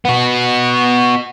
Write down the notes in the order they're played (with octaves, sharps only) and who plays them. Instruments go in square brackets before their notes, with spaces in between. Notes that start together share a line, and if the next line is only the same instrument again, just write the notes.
[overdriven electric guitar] B3 F#4